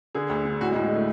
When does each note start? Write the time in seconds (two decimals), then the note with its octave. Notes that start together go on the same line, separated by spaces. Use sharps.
0.15 D3 G#4
0.29 D2
0.45 D3
0.61 A2 F#4
0.71 G#3
0.75 A2
0.84 G#3
0.95 A3